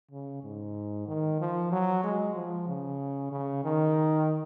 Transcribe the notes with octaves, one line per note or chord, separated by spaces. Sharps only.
C#3
G#2
D#3
F3
F#3
G#3
F3
C#3
C#3
D#3